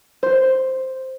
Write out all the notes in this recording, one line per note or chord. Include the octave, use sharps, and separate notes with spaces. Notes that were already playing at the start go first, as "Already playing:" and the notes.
C5